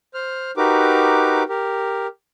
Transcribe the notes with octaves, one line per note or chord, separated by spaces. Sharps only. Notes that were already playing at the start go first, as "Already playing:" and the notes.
C5 F6
D#4 F#4 G4 A#4 B4 D6
G4 A#4